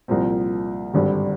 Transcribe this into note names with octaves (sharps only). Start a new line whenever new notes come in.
C2 A#2 F3 C4
G#1 G2 D3 G3